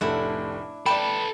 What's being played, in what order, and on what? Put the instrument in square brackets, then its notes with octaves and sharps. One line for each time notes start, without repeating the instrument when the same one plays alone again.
[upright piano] F1 A2 A3 [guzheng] D4 E4 F#5
[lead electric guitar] A4 B4 [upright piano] D5 G5 [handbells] B5